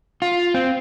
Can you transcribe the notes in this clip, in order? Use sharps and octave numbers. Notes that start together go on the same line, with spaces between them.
F4
C4